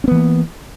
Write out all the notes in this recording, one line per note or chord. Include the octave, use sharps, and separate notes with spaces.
E3 A#3 B3 C#4